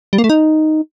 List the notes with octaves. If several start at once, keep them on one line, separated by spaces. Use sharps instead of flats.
G3
A#3
A3
D#4